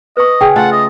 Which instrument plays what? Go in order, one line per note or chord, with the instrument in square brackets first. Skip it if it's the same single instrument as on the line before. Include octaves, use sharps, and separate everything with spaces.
[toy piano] B4 C#6 [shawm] D#5
[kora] C#3 G#4 [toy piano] G5
[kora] A3 F4 A4 [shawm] F#5
[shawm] D#5